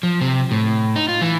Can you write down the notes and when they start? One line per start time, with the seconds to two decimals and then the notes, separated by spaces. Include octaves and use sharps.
0.03 F3
0.21 C3
0.51 A2
0.96 D#4
1.09 F4
1.22 E3